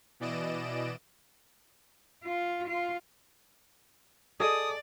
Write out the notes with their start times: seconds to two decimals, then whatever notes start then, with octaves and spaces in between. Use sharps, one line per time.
0.20 B2 E3 D5 D#5 D7 E7
2.24 F4
2.68 F4
4.40 G#4 A4 D5 D#5 D#6